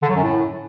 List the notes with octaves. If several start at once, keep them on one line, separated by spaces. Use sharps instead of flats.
D3
F#3
F#2
A2